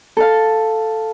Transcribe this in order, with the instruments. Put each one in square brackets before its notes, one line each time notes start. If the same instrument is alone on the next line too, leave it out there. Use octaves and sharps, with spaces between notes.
[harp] A4 F5